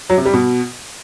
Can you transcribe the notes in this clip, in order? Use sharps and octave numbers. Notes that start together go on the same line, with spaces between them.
F#3
C3
G3
B2